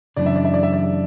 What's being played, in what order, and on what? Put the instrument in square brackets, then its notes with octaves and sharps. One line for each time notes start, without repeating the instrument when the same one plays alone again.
[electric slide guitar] F#2 C#3 E3 A3 D4 [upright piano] D5
[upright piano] E5
D5
E5
D5
E5
D5